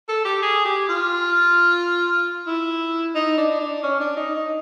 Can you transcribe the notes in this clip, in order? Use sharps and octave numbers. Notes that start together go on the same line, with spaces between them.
A4
G4
G#4
G4
F4
E4
D#4
D4
D4
C#4
D4
D#4
D#4